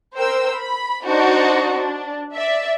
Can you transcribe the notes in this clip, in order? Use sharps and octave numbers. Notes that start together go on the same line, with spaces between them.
A#4 C5 G5 E6
B5
D4 D#4 F#4 C5 D5
D4
D5 E5